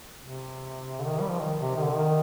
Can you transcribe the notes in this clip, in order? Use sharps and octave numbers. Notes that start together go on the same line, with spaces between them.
C3
D3
D#3
G3
F3
D#3
C3
D#3
D3
D#3